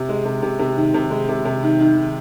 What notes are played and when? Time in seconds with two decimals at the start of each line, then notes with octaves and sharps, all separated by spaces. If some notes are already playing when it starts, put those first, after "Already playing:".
Already playing: C3
0.09 G#3
0.25 C3
0.42 C3
0.59 C3
0.77 D#3
0.94 C3
1.10 G#3
1.28 C3
1.45 C3
1.63 D#3
1.80 D#3